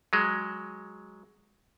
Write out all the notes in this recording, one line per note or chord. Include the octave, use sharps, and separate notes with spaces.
F#3 G#3